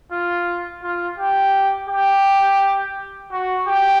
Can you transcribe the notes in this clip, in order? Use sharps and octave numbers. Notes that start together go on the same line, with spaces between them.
F4
F4
G4
G4
F#4
G4